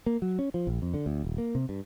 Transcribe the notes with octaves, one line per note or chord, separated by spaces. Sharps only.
A#3
F#3
C#4
F3
A#1
F2
D3
D2
D#1
A#3
C3
G2